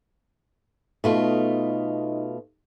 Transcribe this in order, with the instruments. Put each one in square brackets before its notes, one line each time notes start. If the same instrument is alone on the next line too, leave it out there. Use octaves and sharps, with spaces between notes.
[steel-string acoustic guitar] B2 A3 F4 [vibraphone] D#4 D#5